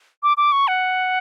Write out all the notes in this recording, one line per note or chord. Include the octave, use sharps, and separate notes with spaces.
D6
D6
C#6
F#5